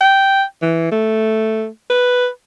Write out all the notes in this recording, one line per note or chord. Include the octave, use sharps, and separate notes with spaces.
G5
E3
A3
B4